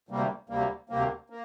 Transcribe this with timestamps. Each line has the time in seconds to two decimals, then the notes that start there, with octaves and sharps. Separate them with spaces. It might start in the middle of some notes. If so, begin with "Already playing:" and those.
0.09 D2 C3 G3 A#3
0.49 D2 C3 G3 A#3
0.89 D2 C3 G3 A#3
1.30 A#3